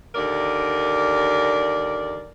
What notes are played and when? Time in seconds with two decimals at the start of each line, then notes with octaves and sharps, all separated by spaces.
0.15 D#2 D3 A#4 D5